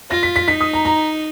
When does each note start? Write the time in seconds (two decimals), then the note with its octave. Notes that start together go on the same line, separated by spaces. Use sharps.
0.11 F4 A#6
0.23 B6
0.36 B6
0.48 D#4 B6
0.61 D#6
0.73 A#5
0.85 A#5